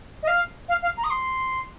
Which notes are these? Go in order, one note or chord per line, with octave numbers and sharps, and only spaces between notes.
D#5
F5
F5
F5
A#5
D#6
C6